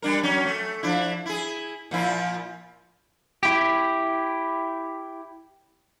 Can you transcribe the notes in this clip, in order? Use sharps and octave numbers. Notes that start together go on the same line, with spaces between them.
G3 D4 A#4
F#3 C#4
A3
F3 D4 E4
E4 G#4
A#2 F3 E4
E4 G4